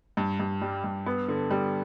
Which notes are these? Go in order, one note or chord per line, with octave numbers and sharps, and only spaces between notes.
G2
G2
G3
G2
B3
D3
G3